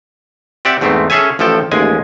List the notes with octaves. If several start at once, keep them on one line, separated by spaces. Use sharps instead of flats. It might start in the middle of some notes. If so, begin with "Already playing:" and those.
C4 G4 D5 E5 F#5
E2 G#2 A3 B3 C4
C#4 G#4 A4 C#5 E5 G#5
A1 A2 F3 A4 G5
A1 D#2 G#3 G#5